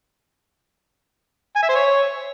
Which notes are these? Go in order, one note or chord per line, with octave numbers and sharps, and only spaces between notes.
G#5
E5
C5
C#5